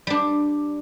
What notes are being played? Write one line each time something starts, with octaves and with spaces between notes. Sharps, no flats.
G3 D4